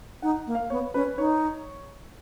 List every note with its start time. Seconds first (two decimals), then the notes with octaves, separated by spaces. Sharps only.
0.22 D#4 F#5
0.47 A#3
0.55 F5
0.70 B3 C#5
0.94 C#4 B4
1.18 D#4 C#5